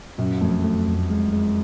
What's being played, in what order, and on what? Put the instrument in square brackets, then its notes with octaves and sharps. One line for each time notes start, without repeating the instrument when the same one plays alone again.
[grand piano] F#2 [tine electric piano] A#2
[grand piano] F2 [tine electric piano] A3
[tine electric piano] A3
F2
G#3
G#3